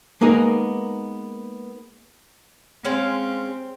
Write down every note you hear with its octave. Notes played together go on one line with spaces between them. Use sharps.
G#3 A#3 B3 D#4 G#4 A#4
G#3 C4 C#4 F5